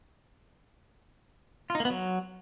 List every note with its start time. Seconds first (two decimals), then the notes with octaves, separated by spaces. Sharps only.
1.70 F4
1.75 D#4
1.80 A#3
1.85 B3
1.90 F#3